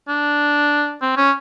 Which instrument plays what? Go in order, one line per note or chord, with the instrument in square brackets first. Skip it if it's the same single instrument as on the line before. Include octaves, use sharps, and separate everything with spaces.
[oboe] D4
C4
C#4